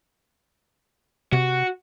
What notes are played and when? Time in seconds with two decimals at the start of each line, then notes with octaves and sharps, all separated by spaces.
1.33 C3 F#4